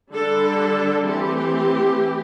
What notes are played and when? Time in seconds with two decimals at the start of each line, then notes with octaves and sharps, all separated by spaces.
0.12 D3 G3 D4 A4
1.06 E3 A3 C4 G4